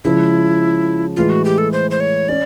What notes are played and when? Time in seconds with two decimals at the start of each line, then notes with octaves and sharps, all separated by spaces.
0.04 C#3 F3 G#3 E4
1.16 A2 E3 G#3 F4
1.30 F#4
1.45 G4
1.58 A4
1.72 C5
1.91 C5
2.00 C#5
2.28 C#4 D5